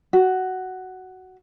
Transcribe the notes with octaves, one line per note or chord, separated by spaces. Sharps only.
F#4